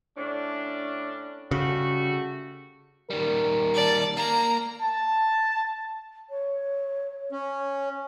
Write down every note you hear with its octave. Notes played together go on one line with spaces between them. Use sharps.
A2 C#4 D4
C#3 G3 A3 F#4
D#3 G3 A#4
D5 A5
A#3 A#5
A5
C#5
C#4